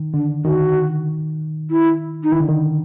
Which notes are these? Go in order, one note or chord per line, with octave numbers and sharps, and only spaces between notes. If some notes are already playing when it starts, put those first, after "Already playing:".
Already playing: D#3
D3 D4
D#3 F#4
E4
D#4
D#3 E4
D3
D#3